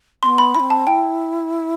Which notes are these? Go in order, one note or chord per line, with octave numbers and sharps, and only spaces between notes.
B3 C4 C6
B5
E4 B5
C4
A5
E4 G5